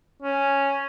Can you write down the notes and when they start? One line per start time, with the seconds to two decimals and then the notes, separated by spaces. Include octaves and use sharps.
0.22 C#4